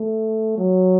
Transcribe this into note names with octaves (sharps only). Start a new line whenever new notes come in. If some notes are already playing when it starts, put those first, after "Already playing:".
Already playing: A3
F#3